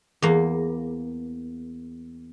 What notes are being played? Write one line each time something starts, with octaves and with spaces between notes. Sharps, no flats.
E2 A#3